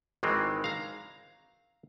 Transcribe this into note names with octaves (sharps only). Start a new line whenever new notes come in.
G#1 D#3 E3 G#3 C4
F5 A#5